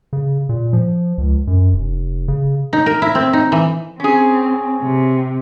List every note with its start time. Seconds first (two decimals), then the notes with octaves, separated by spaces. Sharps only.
0.13 C#3
0.49 A#2
0.73 F3
1.18 C#2
1.47 F#2
1.73 F1
2.28 C#3
2.73 D#4
2.86 A#4
3.02 E4
3.15 C4
3.33 D#4
3.52 E3
4.00 C4 C#4 G#4
4.82 C3